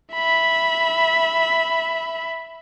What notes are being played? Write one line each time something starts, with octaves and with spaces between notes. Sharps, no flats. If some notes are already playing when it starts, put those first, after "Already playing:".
E5 B5